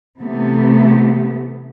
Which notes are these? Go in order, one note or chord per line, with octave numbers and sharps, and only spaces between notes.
C3 E3 A3 B3